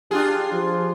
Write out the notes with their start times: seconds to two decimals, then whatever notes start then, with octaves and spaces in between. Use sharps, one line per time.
0.11 D4 F4 G4 G#4
0.53 F3